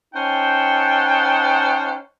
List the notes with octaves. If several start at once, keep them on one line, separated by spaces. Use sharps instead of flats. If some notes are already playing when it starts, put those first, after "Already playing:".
C#4 D#4 C5 F#5 G5 A5